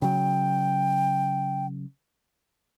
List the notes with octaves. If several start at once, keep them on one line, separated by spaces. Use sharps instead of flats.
C#3 F#3 G5